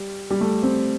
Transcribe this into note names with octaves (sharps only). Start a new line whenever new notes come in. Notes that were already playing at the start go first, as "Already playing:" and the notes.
Already playing: G3
G3
A3
C4